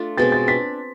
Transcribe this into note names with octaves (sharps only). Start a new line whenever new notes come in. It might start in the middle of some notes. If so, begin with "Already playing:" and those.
Already playing: A3 D4 F4
B2 G#3 C4 A6
A6
D4 B6